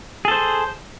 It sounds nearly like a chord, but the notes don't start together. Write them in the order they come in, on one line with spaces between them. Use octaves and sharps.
G#4 A4 C5